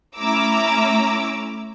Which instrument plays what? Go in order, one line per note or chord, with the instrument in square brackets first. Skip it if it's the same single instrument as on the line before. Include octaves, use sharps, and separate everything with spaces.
[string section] A3 C#4 E4 A#5 D6 E6